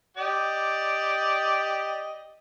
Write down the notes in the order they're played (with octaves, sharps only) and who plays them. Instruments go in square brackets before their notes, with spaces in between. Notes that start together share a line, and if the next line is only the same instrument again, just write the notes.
[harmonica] G4 D5 D#5